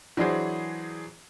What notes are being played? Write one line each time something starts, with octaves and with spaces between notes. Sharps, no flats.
E3 F#3 D4 G#4 C5